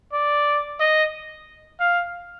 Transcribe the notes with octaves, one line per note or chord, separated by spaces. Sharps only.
D5
D#5
F5